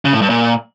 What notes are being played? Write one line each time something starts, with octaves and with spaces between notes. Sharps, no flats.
C#3
A2
G2
A#2